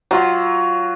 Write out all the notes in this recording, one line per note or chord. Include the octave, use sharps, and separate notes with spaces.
F#3 F4